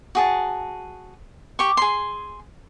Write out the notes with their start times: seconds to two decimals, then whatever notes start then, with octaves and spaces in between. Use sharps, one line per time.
0.15 F#4 G#4 A5
1.59 G4 C#6
1.77 G#4 C6